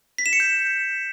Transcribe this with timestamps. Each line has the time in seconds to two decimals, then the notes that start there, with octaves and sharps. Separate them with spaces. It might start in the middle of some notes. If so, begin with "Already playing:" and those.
0.18 B6
0.26 E7
0.33 C#7
0.40 G6